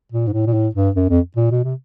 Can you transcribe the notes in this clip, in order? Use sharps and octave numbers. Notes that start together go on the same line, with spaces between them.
A#2
G#2
A2
A#2
A2
G2
F#2
F2
A#2
B2
C3